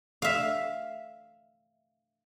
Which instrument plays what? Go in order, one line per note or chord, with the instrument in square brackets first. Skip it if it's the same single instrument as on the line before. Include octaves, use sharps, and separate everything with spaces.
[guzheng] E5 F5